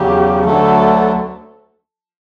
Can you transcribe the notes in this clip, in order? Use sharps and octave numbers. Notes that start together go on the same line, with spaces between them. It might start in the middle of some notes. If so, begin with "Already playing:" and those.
Already playing: E2 C#3 F#3 G4
D2 D3 F#3 A3 A4